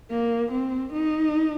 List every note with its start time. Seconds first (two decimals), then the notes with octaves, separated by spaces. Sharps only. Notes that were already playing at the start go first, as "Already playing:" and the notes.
0.11 A#3
0.51 C4
0.93 D#4